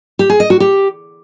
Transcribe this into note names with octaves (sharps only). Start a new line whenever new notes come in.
G4
G#4
D#5
F#4
G4